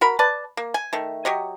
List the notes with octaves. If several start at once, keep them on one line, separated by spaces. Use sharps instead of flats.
F#4 A#4 B5
B4 D5 A5
A#3
G#5
D#3 A3
F#3 G4 C#5 D#5